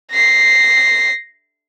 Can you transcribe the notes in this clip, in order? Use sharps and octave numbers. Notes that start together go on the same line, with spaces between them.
A#6 C7